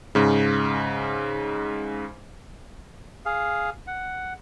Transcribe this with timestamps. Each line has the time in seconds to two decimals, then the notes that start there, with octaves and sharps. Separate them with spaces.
0.15 G#2 C#3
3.26 G#4 F5
3.87 F#5